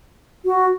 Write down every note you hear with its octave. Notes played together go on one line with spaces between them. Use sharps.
F#4